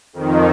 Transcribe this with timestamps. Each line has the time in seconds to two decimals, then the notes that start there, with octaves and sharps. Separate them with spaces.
0.13 F2 D#3